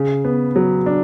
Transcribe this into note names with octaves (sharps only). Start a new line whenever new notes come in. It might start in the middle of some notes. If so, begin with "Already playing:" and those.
Already playing: C#3
B3
F#3
D4